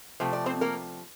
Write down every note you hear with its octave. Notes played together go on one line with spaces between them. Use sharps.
C3 F3 A3 C5
D5
C4 C5
A#3 A#4